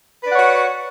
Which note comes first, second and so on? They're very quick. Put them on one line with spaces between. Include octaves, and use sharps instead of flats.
B4 D5 F#5 C#5 F#4